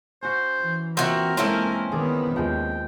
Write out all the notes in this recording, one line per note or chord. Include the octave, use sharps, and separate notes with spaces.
C#4 F#4 C5
E3
A#2 C4 F#4 A#4 E5
E3 G#3 A#3 C4 C#4 E4 A4 C5
D#3 B3 G#4 D5
D#2 F3 G#3 G5